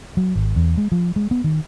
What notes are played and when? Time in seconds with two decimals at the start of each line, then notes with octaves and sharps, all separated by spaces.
0.17 F#3
0.35 G#1
0.56 E2
0.77 G#3
0.92 F3
1.16 G#3
1.31 B3
1.44 D#3